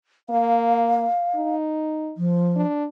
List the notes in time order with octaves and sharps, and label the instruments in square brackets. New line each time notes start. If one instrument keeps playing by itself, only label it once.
[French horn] A#3 [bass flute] F5
[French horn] D#4
[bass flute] F3
[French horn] D4